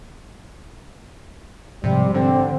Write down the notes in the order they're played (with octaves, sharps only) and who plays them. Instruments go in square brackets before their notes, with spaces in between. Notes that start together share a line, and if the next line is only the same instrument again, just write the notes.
[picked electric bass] G#2 F3 G#3 [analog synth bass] C3 [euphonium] G3
[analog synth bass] D3 [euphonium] C4